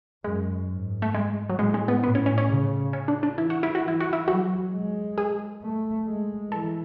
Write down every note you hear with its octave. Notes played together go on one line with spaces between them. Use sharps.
F#2 G#3
G#2
A3
G#3
F#3
A2 G#3
G#3
B3
A2 B3
C#4
C#4
C#4
C#3
C#4
D4
D4
E3 E4
F#4
E4
F#4
E3 E4
F#4
E4
F#3 F#4
G#3
G#4
A3
G#3
E3 A4